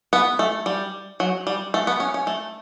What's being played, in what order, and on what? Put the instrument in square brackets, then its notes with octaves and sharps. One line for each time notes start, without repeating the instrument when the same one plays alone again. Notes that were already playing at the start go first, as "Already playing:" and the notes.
[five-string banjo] B3
A3
G3
F#3
G3
A3
B3
C#4
C#4
A3